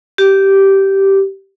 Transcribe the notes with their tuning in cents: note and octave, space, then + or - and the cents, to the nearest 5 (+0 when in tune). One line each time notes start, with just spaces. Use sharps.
G4 -10